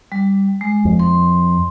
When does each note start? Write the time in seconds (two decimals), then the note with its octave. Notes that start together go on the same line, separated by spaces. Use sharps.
0.12 G3
0.61 G#3
0.85 F2
0.99 C6